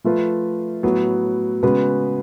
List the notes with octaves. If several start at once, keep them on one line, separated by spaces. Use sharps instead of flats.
F3 A3 F4 B4
A2 F#3 B3
C#3 G#3 B3 F#4 B4